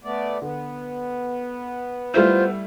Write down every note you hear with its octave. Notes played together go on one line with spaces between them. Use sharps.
A3 B3 D5
D3 B3
G3 A3 E4 F4 C5